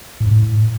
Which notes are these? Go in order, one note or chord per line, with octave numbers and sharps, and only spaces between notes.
A2
F#2
A2